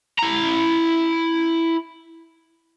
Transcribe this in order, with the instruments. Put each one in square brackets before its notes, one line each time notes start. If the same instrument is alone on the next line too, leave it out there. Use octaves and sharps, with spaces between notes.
[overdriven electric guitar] E4 A#5